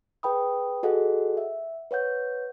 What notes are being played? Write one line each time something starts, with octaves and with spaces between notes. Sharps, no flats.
G#4 B4 G5 B5 D#6
F#4 G#4 A4 D#5 F#5
E5 F#5
B4 C#5 F#5 G6